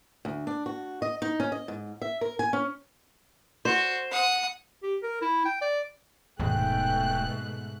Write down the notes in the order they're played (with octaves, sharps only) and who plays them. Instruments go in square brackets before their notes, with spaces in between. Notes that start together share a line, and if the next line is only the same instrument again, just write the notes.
[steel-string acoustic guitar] D2
D4
F#4
D#5
D#4
C#4
D#5
G#2
E5
A#4
G#5
C#4
[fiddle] F#4 [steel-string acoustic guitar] C5
[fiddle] F#5 D#6
[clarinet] G4
A#4
E4
G5
D5
[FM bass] D#1 [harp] G#2 G#3 [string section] B2 A3 F#6 [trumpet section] G5